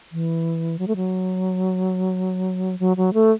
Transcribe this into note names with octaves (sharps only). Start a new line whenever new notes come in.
E3
F#3
A3
F#3
F#3
F#3
A3